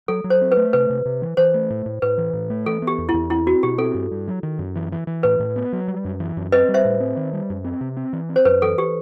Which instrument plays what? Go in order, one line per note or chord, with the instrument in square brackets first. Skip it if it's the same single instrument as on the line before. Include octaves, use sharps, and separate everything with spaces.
[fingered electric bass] F#3 [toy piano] A4
[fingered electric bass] F#3
[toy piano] C5
[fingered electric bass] C4
[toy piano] B4
[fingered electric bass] A3
[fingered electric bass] C3 [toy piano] B4
[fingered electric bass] C3
C3
E3
[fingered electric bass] E3 [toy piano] C5
[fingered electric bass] A3
A2
A2
[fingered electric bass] A2 [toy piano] B4
[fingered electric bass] E3
A2
A3
[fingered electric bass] E3 [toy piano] A4
[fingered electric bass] B3
[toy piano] G4
[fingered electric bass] E2
[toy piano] E4
[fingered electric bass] E2
[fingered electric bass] C4 [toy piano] E4
[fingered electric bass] C4 [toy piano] F#4
[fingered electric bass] B2 [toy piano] G4
[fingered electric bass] C4 [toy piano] A4
[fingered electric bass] G2
G2
F#3
D#3
F#2
E3
E3
E3
[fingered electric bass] A2 [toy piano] B4
[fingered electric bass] A2
B3
F#3
G3
F#2
E3
F#2
[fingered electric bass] C4 [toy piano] B4 D#5
[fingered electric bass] G3
[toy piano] C5 E5
[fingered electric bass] A2
C4
D#3
G3
F#2
C4
C3
C4
E3
C4
[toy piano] C5
[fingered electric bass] F#2 [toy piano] B4
[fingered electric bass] E3 [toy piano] A4
[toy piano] G4